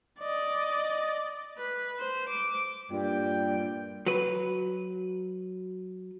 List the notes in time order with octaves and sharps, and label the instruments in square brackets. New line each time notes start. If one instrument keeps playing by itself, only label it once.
[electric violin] D5 D#5
[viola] B4
C5
D6
[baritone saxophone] G2 [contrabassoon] A#2 [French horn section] D5 [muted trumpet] G5
[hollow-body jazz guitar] F#3 B4